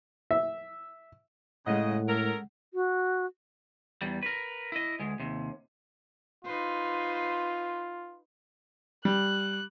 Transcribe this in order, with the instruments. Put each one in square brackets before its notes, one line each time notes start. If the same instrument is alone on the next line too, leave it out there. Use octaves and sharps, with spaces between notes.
[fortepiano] E5
[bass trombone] A2 [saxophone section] C#3 D#5 [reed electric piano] G#3 F#5
[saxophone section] C#4 A4 A#4
[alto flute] F#4
[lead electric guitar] E2 G3
A#4 B4
E4 D#5
D2 G#3
D#2 C3
[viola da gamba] D#4 B4 C5 [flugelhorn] F4
[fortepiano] G3 [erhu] F#6